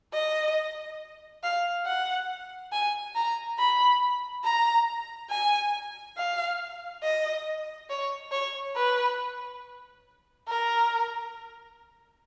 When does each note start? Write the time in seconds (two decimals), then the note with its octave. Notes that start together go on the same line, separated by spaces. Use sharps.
0.13 D#5
1.43 F5
1.86 F#5
2.73 G#5
3.15 A#5
3.59 B5
4.44 A#5
5.31 G#5
6.17 F5
7.03 D#5
7.90 C#5
8.32 C#5
8.76 B4
10.48 A#4